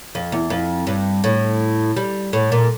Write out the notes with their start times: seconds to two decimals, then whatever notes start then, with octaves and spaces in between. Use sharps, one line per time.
0.15 F2
0.32 E2
0.50 F2
0.87 G2
1.24 A2
1.96 G3
2.33 A2
2.52 A#2